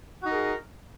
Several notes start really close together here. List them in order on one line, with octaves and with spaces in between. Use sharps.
F#4 D#4 A#4 G#4